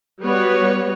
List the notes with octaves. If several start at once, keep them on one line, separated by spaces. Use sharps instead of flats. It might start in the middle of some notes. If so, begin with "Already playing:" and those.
G3 B3 F#4 B4 C#5